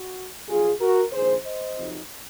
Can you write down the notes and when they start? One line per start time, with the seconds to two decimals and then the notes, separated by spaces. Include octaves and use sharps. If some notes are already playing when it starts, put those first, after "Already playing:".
Already playing: F#4
0.48 A#1 A#2 F#3 F4 G#4
0.80 F#4 A#4
1.12 A#1 G#2 D#3 G#4 C5
1.44 C5 D#5
1.77 F2 C3 F#3 C4 D#4